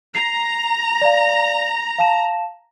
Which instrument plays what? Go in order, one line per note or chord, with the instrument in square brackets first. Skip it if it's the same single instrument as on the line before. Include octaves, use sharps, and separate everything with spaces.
[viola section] A#5 [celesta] C7
[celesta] D5 F5
F5 A5 E7